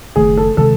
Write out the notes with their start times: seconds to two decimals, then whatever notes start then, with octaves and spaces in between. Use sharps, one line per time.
0.16 F#1 F#2 D#3 A3 G#4
0.37 A4
0.57 C3 D#3 G#3 A4